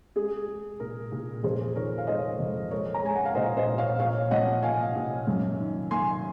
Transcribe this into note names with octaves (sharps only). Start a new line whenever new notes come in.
G#3 G#4
G#3
A#2 A#4
A#2
F2 G#4 C5
D#3 A#4 C#5
F5
G#3 C5 D#5
F2
G#3 A#4 C#5
A#5
G#3 G#5
F#5
F5
A#2 C5 D#5
C5 D#5
A#2
C#5 F5
A#2 C#5 F5
F3 D#5 F#5
A#3 F5 G#5
A#2
F#2
D#3
A#3 G#5 C6